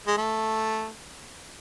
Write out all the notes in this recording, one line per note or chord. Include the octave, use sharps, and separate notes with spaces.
G#3
A3